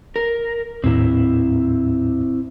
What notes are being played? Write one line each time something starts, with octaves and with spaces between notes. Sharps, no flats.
A#4
D#2 A2 C4 E4